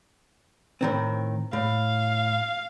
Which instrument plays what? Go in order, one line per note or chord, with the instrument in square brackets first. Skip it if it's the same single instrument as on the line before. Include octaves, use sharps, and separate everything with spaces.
[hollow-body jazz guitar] A2 D#3 C4
[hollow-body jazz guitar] A2 [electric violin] F5